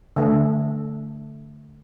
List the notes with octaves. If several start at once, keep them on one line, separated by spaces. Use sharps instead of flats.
D3 A3